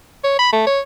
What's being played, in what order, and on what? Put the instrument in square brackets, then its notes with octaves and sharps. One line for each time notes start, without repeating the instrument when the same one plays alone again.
[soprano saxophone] C#5
B5
A3
C#5